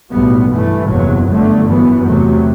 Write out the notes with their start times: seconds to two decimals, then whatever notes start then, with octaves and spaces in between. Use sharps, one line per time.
0.11 B1 A2 G3 B3
0.50 G2 E3 A3
0.88 F#1 E2 C3 F#3
1.27 G1 G2 D3 A3
1.66 F#2 E3 B3
2.06 E2 C3 F#3 A3